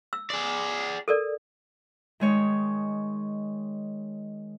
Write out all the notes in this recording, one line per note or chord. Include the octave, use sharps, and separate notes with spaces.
E6
G#4 D5
A4 A#4 D5
D#3 G#3 C#5